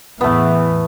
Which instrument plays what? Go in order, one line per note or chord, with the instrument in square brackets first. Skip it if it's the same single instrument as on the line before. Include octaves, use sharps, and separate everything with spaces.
[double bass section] E2 A2 E3 [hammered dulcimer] A3 B3